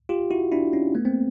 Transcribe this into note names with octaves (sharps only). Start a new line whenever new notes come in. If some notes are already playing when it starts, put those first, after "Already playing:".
F4 G4
E4 F#4
D4 E4
C#4 D#4
A3 B3
A#3 C4